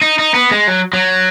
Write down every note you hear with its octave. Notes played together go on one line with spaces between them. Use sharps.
D#4
D#4
B3
G#3
F#3
F#3